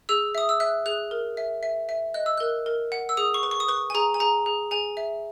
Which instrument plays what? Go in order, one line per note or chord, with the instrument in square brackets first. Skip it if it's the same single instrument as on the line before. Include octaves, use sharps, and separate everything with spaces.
[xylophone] G#4 E6
E5 D#6
E6
E5 F#6
G#4 F#6
A#4
E5
E5
E5
D#5 F#6
E6
A#4 F#6
A#4
F#5
E6
G#4 D#6
C#6
B4
C#6
D#6
B4 C#6
G#5
G#4 A#5
G#5
G#4 A#5
G#4
G#4 G#5
E5